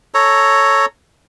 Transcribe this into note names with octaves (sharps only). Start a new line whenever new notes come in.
A4 C#5 A#5